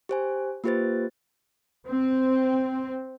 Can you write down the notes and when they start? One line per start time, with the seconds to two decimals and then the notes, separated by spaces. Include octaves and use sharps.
0.09 G4 C5 G#5
0.64 A#3 F4 G4 B4 C5 A6
1.85 C4